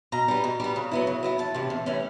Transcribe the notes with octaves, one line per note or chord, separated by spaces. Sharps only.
B2 A#5
G3 B3
B2
G3 B3
C#3
F#3 B3 E4
C#3
F#3 B3 E4
E2 A5
C3 E3 A3 C#4
E2
C3 E3 A3 C#4